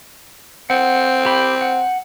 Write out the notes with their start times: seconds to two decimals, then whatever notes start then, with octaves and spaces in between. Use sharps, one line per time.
0.70 C4 F#5
1.26 G4 B5 D6
1.61 F#5